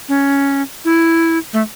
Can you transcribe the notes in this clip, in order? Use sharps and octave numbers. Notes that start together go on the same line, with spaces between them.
C#4
E4
A3